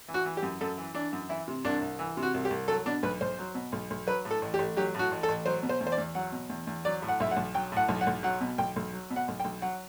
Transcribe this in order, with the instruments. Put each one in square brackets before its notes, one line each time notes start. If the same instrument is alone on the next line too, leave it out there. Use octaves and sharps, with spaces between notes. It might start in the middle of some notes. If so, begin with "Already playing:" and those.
[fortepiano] E3
F#4
E3
G4
F#2
F#2 A4
E3
E3 D4
F#2
E3 E4
C3
C2 D4
C2
E3
C3
F#4
C2
G4
C2
F#3 A4
B2 D4
B1 B4
B1 C5
F#3
B2
B1
B1
F#3 B4
A2
A4
A1
G4
A1
F#3 G4
A2 F#4
A1
A4
A1
F#3 C5
B2
C5
E2
C5
D5
E2
F#3 F#5
B2
E2
E2
F#3 D5
A2
F#5
B1 E5
F#5
B1
F#3 G5
A2 F#5
B1
F#5
B1
F#3 F#5
B2
B1 G5
B1
F#3
B2
F#5
B1
G5
B1
F#3 F#5